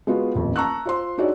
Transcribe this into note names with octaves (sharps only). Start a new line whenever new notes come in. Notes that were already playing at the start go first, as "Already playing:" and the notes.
G#3 B3 F4 F#4
D#1 A1 F2
A5 A#5 C#6 E6 F#6
F4 C5 C6
D4 D#4 F#4 G#4 C#5 D5